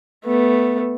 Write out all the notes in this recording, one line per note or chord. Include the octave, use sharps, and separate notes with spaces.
A3 B3